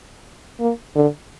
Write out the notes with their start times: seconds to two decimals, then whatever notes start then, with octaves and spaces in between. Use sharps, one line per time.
0.60 A#3
0.96 D3